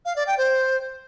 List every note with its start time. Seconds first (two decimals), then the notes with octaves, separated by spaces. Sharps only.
0.05 F5
0.16 D5
0.27 G5
0.38 C5